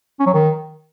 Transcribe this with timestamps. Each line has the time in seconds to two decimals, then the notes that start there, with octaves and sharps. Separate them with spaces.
0.20 C#4
0.27 F#3
0.34 D#3